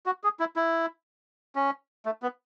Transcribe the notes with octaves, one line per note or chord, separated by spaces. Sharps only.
F#4
G#4
E4
E4
C#4
A3
B3